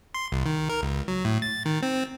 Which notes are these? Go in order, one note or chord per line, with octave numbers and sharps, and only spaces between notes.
C6
C2
D#3
A#4
C#2
F#3
A2
A6
D#3
C4